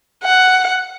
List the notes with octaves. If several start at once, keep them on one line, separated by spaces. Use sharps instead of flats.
F#5